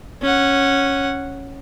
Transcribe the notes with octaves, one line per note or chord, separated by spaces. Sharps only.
C#4 F#5